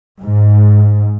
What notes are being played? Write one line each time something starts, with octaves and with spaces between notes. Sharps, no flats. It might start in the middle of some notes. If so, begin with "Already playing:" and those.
G#2